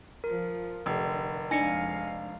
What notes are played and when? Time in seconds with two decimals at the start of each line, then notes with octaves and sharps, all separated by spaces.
0.24 F3 A#4
0.86 F1 D3
1.51 F2 G#3 D4 D#4 F5 G#5 A#6 C#7